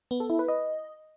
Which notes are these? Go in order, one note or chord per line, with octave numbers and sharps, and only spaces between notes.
B3
A4
E4
B4
D#5